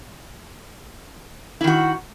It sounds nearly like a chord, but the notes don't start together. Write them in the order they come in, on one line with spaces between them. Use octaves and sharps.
E4 D#3 F#4